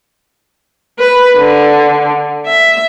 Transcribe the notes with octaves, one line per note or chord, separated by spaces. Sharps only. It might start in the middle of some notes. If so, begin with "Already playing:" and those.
B4
D3
E5